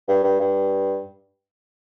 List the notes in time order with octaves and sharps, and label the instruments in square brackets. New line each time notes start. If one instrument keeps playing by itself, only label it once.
[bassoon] G2
G2
G2